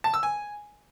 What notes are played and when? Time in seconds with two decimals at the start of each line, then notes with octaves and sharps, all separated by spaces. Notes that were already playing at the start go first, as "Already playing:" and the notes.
0.04 A5
0.14 E6
0.23 G#5